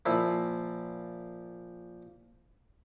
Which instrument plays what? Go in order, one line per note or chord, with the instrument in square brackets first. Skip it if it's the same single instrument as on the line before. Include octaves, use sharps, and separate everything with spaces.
[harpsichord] A#2 F3 E4